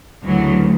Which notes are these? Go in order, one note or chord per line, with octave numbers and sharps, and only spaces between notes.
D2 C#3 E3 F#3